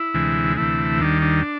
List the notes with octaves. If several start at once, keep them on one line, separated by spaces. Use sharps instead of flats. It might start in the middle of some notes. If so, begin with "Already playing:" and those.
Already playing: E4
D2 C3 E3 G#3
D2 C3 E3 A3 E4
D#2 D#3 G3 D4
D4